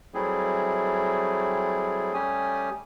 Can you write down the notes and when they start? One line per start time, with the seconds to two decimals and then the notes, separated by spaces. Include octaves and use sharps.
0.14 F#3 G3 A3 C4 E4 G#4
2.14 G3 A3 C#4 G4 G#5 D#6